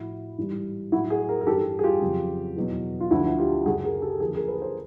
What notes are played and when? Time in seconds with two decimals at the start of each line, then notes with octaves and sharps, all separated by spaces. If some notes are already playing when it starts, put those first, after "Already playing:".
Already playing: A2 F3 E4 F#4
0.37 G#2 E3 G3
0.92 F#3 E4 F#4
0.96 A2
1.10 F#4 G#4
1.29 G#4 A#4
1.41 A#4
1.47 G2 E3 G3 G4 A4
1.79 G#4
1.84 F4 G4
2.01 F2 C#3 F#3
2.56 E2 B2 F#3
3.00 F4
3.11 D2 D3 F3 E4 F#4
3.38 F4 G4
3.66 F#2 C#3 F#3 F#4 G#4
3.84 G#4 A#4
4.02 G4 A4
4.20 D#2 D3 F3 G#4 A#4
4.35 G#4 A#4
4.48 A4 B4
4.61 A#4 C5